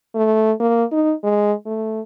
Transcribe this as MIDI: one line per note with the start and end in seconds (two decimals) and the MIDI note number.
0.15 0.52 57
0.60 0.84 58
0.92 1.13 63
1.24 1.53 56
1.66 2.01 57